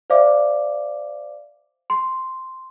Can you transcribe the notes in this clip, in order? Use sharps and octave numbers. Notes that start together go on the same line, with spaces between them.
C5 D5 E5 F5 D6
C6